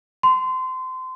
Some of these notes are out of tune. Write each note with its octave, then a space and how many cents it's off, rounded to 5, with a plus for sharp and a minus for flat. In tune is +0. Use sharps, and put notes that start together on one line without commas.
C6 -25